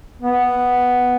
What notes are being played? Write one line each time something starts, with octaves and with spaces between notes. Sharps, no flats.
B3